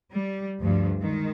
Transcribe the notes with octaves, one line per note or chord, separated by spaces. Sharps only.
G3
D2 G2 F3
D#3 G#3